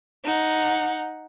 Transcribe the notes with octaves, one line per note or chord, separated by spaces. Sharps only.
D#4 F#5